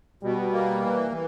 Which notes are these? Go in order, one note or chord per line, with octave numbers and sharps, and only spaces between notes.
B2 G3
A#3
E3
E3